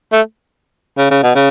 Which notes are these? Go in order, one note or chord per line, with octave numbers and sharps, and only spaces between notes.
A3
C#3
C#3
B2
C#3